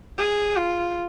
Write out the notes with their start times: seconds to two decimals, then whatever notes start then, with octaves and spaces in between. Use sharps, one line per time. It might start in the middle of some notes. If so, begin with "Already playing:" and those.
0.18 G#4
0.56 F4